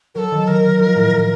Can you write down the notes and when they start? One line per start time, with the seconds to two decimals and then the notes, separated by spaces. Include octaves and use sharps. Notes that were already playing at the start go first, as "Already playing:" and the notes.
0.15 F#3 A4 A#4
0.31 D#3
0.48 D#3 A#4
0.63 D#3
0.80 F3
0.95 A2
1.11 A2